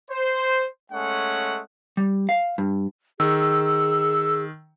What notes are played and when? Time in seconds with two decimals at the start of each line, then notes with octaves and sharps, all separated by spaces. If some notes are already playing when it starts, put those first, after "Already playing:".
0.11 C5
0.92 G#3 A3 C#4 F#5
1.97 G3
2.29 F5
2.58 G2
3.20 D#3 G#4 E6